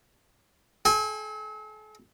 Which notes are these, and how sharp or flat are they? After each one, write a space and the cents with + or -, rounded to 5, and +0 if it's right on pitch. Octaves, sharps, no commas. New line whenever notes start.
A4 -45 G#5 -30